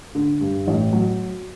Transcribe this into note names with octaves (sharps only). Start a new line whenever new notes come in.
D3
G2
A1
F#3